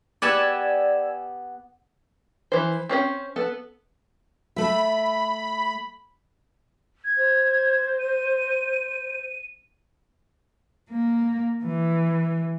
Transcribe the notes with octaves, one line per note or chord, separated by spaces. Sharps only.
B3 G4 D5 F#5 G#5 E6
E3 C5
C4 C#4 B4 G5
B3 A4
A3 E5 B5
G#6
C5
D#7
A#3
E3